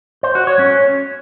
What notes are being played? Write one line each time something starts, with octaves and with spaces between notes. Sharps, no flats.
C5
F#4
C#5
C#4